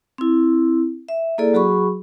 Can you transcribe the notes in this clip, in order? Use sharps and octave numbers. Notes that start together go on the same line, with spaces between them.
C4 E4
E5
A#3 E4 G#4 A4 D5
F#3 F#4 G#4 B5 C#6